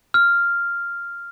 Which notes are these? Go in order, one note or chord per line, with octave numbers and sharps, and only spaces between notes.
F6